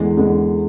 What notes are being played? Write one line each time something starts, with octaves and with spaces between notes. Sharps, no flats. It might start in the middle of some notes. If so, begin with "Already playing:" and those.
Already playing: E2 D3 G#3
E2 D3 G#3